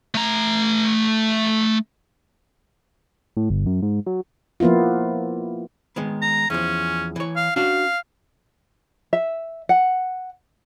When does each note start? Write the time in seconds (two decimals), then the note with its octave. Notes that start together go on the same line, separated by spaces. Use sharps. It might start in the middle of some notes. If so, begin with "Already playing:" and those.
0.15 A3 A#5
3.37 A2
3.50 G1
3.66 F#2
3.82 G#2
4.07 F#3
4.60 F3 A#3 B3 E4 F4
5.96 D#3 G#3 B3
6.22 A#5
6.50 E2 F3 C#4
7.16 E3 C#5
7.36 F5
7.56 C#4 D4 F#4 F5
9.13 E5
9.69 F#5